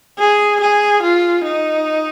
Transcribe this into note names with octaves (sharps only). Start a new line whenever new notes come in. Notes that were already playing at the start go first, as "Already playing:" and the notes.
G#4
G#4
F4
D#4